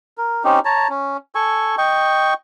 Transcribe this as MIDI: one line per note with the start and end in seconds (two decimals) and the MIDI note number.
0.18 0.43 70
0.44 0.60 60
0.44 0.60 61
0.44 0.60 63
0.44 0.60 67
0.65 0.88 73
0.65 0.88 81
0.65 0.88 82
0.89 1.17 61
1.35 1.75 69
1.35 1.75 80
1.35 1.75 85
1.78 2.34 75
1.78 2.34 79
1.78 2.34 85